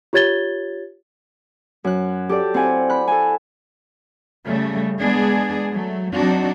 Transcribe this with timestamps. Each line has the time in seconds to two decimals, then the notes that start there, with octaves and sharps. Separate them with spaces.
0.13 F4 G4 C#5 G#6 A6 G7
1.84 F#2 F#6
2.29 G4 A4 D5
2.54 C4 E4 F#5 G#5
2.90 B5 F#6
3.08 A4 G#5
4.46 C#3 G3 A3
5.00 G#3 B3 D4 G#4
5.72 F#3 A3
6.13 F#3 C4 D4 D#4 F#4